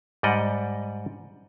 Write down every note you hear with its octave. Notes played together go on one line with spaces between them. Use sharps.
G#2 G3 D5 D#5 F#5